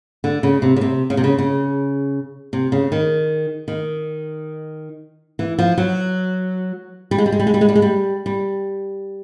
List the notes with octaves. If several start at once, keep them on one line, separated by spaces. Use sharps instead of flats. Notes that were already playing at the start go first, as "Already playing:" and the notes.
D3
C#3
C3
C#3
C3
C#3
C3
C#3
C#3
C3
C#3
D#3
D#3
E3
F3
F#3
G3
G#3
G3
G#3
G3
G#3
G3
G#3
G3
G#3
G3
G3